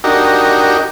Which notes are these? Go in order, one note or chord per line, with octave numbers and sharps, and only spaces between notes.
D4 D#4 F#4 G4 A#4